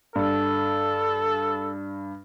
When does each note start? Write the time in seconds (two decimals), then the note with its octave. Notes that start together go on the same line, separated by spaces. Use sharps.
0.15 G2 A4